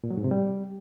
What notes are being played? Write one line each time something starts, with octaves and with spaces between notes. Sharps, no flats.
A#2
F#3
G#2
C3
G3